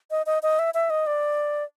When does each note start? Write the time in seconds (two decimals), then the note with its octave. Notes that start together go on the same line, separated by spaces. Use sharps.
0.11 D#5
0.26 D#5
0.43 D#5
0.59 E5
0.74 E5
0.90 D#5
1.07 D5